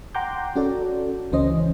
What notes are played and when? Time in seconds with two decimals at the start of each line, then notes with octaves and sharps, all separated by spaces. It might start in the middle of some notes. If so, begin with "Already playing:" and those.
0.15 F#5 G5 A#5 C6 D6 G6
0.56 C#4 F#4 A4 D5
1.32 C#2 E3 C#4 C5 D#5